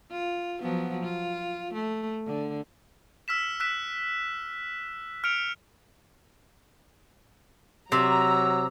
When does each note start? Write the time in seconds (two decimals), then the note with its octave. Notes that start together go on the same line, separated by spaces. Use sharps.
0.11 F4
0.61 F3 F#3 B3
1.04 F4
1.74 A3
2.27 D3
3.28 E6 F6 B6 E7
3.60 E6 F#6 B6 E7
5.24 F6 C#7 D7 F7
7.92 C3 F#3 A#5 E6